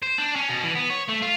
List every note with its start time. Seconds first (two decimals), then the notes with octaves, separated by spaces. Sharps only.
0.03 C5
0.18 D4
0.36 C#4
0.49 B2
0.63 E3
0.75 B3
0.90 C#5
1.09 A3
1.22 F4